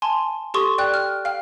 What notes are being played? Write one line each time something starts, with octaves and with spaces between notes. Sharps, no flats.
G#5 A5 C6
G4 A4 C6 C#6 D#6
D5 G5 F#6
F6
F5 G5 F6